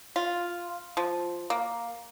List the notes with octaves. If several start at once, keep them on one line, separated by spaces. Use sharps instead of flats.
F4
F3
A#3